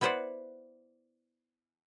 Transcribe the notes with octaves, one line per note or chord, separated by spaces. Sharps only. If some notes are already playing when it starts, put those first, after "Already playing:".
B3 E4 B4 C5 D5 F#5